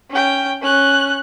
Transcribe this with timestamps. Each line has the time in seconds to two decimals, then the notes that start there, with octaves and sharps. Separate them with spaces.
0.10 C#4 G5
0.62 C#4 F#6